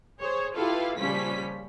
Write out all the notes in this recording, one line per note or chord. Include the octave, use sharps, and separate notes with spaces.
G#4 C5 C#5
E4 F4 G4 A4 B4 F5
A#1 C#3 F3 G3 C#4 B6